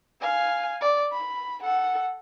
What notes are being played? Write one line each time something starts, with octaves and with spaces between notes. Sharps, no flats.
F5 G#5
D5
B5
A4 F#5